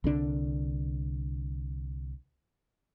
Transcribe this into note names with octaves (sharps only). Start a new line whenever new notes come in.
C2 D3 D4